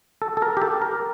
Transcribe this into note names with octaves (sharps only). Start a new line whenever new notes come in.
A4
A4
A#4
G4
A4
A#4